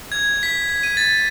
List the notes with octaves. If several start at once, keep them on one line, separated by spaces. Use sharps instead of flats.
G#6
B6
D#7
A6